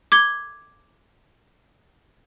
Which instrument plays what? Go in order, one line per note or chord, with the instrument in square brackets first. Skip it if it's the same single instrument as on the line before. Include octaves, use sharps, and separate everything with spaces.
[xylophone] D6 G#6 G7